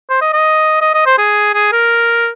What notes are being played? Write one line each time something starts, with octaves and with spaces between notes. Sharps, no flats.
C5
D#5
D#5
D#5
D#5
C5
G#4
G#4
A#4